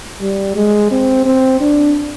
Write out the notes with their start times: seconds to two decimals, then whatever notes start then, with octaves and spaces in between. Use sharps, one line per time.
0.21 G3
0.56 G#3
0.91 C4
1.26 C4
1.60 D4